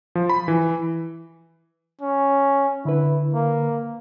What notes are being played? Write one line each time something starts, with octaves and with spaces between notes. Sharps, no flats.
F3
B5
E3
C#4
D3 E4 B4
A#3